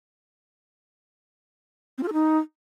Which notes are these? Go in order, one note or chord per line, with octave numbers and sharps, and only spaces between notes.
C4
F4
A4
D#4